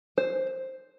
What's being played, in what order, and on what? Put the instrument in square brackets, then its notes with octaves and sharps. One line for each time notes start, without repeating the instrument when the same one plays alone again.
[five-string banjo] C5